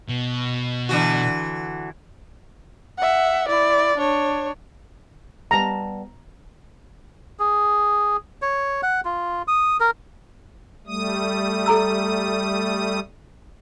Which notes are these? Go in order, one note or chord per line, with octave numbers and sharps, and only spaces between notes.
B2
D3 E3 F#4
E5 F#5
E4 D5
D4 C#5
G3 B3 A5 A#5
G#4
C#5
F#5
F4
D#6
A#4
G3 A3 D#6
A4 A#5 E6